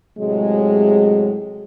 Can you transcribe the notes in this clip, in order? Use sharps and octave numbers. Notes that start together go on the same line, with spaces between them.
A2 C3 F#3 G#3